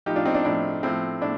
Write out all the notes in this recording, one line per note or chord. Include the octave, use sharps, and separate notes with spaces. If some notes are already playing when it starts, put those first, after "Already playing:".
A2 F3 D#4 G4
D4 F4
C4 D#4
D4
A2 F3 D4
A2 F3 C4
A2 D4